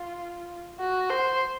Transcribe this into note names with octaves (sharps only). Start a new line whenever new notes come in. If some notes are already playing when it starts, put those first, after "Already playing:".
Already playing: F4
F#4
C5